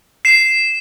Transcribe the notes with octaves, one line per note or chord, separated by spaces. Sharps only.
C7 E7